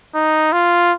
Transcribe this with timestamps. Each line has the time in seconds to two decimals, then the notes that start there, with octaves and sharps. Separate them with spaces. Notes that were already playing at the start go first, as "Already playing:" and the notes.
0.15 D#4
0.52 F4